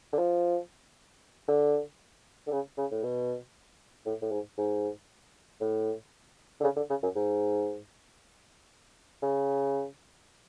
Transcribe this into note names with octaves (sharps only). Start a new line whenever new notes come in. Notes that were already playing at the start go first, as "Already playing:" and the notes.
D3
F3
D3
D3
C#3
C#3
A2
B2
A2
A2
G#2
G#2
A2
D3
C#3
D3
C#3
F#2
G#2
C#3